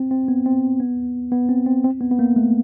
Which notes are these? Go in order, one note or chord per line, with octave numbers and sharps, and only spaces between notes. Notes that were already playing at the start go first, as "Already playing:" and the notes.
Already playing: C4
C4
B3
C4
B3
B3
C4
C4
C4
B3
B3
A#3
A3